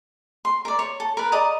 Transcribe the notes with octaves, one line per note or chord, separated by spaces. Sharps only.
C6
A#4 D5
C#5
A4
A#4 B4
D5 D#5 A#5 D#6